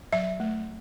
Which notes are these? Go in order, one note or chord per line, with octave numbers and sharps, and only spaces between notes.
F#3 E5
A3